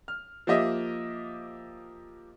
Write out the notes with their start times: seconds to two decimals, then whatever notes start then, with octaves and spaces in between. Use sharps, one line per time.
0.08 F6
0.47 F3 A#3 G4 D#5 E5